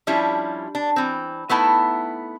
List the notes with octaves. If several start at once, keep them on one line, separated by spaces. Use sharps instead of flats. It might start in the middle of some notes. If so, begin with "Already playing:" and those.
F3 G3 C#4 D4 E4
D4
E3 C4
A3 B3 D#4 E4 A5